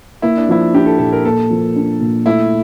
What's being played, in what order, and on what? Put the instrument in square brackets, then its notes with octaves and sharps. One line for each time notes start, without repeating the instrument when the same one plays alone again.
[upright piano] A#3 [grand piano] E4
[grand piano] D4
[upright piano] F3 [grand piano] E4
[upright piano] D4 [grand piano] G4
[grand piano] A4
[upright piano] A#2 [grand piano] A4
[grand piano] A#4
[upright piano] A#3 [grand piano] A4
[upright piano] F3
D4
A#2
[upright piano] A3 [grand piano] E4